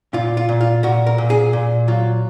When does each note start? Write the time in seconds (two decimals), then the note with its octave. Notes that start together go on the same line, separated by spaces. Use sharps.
0.13 A#2 F4
0.37 F4
0.49 A#2
0.61 F4
0.83 A#2 F#4
1.07 A#4
1.18 A#2
1.30 G#4
1.53 A#2
1.88 F#3 F4